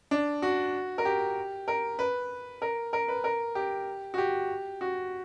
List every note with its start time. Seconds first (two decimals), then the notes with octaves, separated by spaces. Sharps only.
0.11 D4
0.42 F#4
0.98 A#4
1.05 G4
1.68 A#4
1.99 B4
2.62 A#4
2.93 A#4
3.08 B4
3.24 A#4
3.55 G4
4.14 F#4
4.18 G4
4.81 F#4